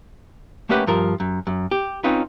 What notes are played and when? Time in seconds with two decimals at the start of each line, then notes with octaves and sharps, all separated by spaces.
0.69 A3 A#3 C#4 G4 B4 F#5
0.87 G2 F3 A#4
1.20 F#2
1.47 F#2
1.71 G4
2.04 C4 C#4 D#4 F4 B4